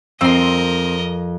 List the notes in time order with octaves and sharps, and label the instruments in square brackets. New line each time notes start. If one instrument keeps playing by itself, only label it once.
[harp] F2 [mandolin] C4 C6 [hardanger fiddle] A#4 D#5